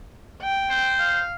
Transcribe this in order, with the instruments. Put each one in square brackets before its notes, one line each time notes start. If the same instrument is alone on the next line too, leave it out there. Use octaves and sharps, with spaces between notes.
[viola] G5
[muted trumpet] C5
[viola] F5